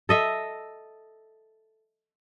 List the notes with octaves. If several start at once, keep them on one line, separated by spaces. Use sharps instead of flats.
A4 D#5 E5